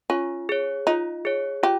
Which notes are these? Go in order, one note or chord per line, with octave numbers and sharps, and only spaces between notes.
C#4 F4
G#4 C#5
D#4 F4
G#4 C#5
F4 G4